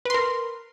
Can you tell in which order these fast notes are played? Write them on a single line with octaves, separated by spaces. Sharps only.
B4 C6 A#4